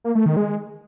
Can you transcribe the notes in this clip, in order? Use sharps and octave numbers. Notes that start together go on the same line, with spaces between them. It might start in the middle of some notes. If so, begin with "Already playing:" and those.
A#3
A3
D#3
G#3